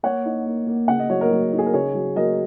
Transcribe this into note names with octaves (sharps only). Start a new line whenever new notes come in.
A#3 C#5 F#5
D#4
A#3
A#3
C#3 F#5
D#5
F#3 C#5
A#4 D#5
F#3
D#4
G#4
A#4
C#3 G#4 C#5
F#3
F#3 A#4 D#5